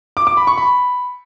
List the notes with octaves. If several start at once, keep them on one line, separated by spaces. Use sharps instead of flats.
D6
D6
B5
C#6
B5